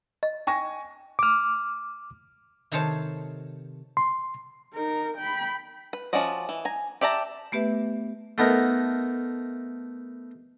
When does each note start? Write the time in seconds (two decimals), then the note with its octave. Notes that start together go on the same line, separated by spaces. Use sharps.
0.23 D#5
0.47 G5 G#5 C#6 A#6
1.19 D6 F6
2.72 C3 D#3 A4 C5 C#5 A5
3.97 C6
4.74 D#4 A#4
5.17 G5 B5
5.93 B4
6.13 F3 C#4 F#4 D5 D#5
6.49 E3
6.65 G#5 A#5
7.01 G4 D5 E5 A5 A#5
7.52 A3 B3 G4 B4 E5
8.38 A3 B3 D#4 A#4